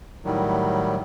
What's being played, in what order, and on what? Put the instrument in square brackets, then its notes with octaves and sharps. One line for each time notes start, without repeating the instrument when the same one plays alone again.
[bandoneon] A2 D#3 F#3 G3